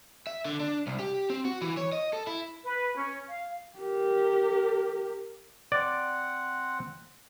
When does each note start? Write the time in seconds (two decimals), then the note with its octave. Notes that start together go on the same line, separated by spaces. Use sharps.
0.27 E5
0.45 D3
0.60 D4
0.87 C2
0.99 G4
1.30 C4
1.45 F#4
1.62 E3
1.77 C#5
1.92 D#5
2.13 A4
2.27 E4
2.64 B4
2.96 C#4
3.28 F5
3.78 G4 A#4
5.72 C4 D5 F#5